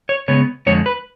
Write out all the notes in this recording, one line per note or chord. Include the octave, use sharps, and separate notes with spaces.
C#5
C#3 G#3 B3 C#5
F2 D3 G#3 C#5
B4